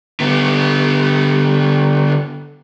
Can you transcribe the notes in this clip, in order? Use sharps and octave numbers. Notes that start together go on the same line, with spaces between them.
D3 B3